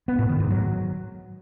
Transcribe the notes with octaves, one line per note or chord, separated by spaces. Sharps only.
B3
A2
D#3
G#2
F#3